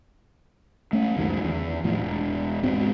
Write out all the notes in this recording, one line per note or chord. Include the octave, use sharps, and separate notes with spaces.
A3 C#4
C#2 F#2 D#3 F3
E2
E2 A2 F3
E1
E1 G#2 B2 C4